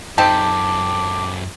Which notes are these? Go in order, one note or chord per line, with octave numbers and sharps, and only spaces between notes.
F#2 C4 D#4 G4 A4 A5 D6